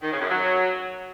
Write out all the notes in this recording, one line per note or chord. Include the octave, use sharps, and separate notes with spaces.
D#3
C#3
F#2
F#3